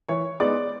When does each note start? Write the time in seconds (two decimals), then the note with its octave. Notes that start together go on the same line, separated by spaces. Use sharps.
0.09 E3 C#5 C#6
0.40 G#3 B3 D#4 D5 D6